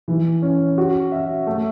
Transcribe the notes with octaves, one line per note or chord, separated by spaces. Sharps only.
E3
C#4
F#4
E5
A3